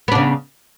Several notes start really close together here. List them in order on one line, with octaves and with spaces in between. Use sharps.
B3 D4 C#3